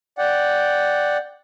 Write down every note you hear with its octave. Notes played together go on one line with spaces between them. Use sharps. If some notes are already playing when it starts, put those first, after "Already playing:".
D5 F#5 G5